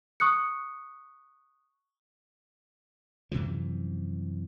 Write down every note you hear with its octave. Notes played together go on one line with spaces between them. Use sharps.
C#6 D#6 F#6 C#7
F#2 C3 E3 F3